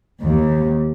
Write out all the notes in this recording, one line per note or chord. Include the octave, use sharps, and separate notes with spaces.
D#2